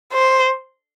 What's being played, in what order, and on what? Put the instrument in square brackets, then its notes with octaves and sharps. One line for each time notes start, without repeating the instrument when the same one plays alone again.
[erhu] C5